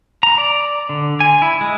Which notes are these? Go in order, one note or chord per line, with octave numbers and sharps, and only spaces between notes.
A#5
D5
D3
G#5
E4
G#3